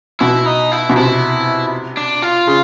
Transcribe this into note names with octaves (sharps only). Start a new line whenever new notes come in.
B2 E4
D#4
E4
B2
C3 E4
D4
F4
C#3